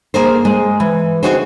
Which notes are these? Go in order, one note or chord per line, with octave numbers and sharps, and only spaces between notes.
A#3 G#4 A#4 C5
G#3
E3
C4 C#4 D#4 F#4 G#4 C5